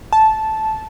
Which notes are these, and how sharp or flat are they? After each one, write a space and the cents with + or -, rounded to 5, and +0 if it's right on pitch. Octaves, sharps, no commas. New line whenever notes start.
A5 -10